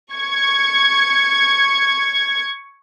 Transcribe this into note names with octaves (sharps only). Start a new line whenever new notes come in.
C#6 G#6